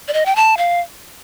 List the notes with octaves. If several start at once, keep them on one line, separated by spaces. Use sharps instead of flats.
D5
D#5
G5
A5
F5